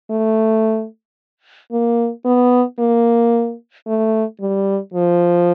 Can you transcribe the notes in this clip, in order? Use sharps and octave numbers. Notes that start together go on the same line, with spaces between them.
A3
A#3
B3
A#3
A3
G3
F3